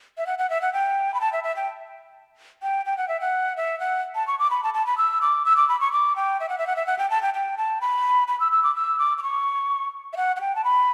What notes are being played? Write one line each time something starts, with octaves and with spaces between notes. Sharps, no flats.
E5
F#5
F#5
E5
F#5
G5
B5
A5
E5
E5
G5
G5
G5
F#5
E5
F#5
E5
F#5
A5
C#6
D6
B5
A5
A5
B5
E6
D6
E6
D6
B5
C#6
D6
G5
E5
F#5
E5
F#5
E5
F#5
G5
A5
G5
G5
A5
B5
B5
E6
E6
D6
E6
D6
D6
C#6
E5
F#5
F#5
G5
A5
B5